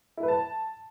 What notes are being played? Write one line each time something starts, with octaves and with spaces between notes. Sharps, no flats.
E4
B4
A5